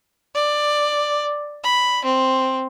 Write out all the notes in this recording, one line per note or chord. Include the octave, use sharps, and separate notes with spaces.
D5
B5
C4